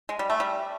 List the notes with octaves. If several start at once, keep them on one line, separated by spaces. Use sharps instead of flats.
G#3
G3
A3
G3